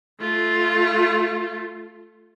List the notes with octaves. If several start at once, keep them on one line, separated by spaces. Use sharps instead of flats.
A3 F4